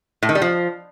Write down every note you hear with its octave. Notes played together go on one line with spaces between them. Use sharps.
A2
D#3
G3
F3